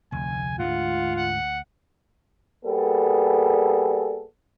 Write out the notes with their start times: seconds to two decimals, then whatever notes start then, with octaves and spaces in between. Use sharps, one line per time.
0.12 F1 D2 G#5
0.59 G#2 D3 G#3 F4 F#5
1.17 F#5
2.65 G3 A#3 B3 G#4 A4